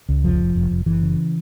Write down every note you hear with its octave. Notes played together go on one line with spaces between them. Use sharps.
C#2
F1 F3
F1
F1
F1
F#1 E3
C#3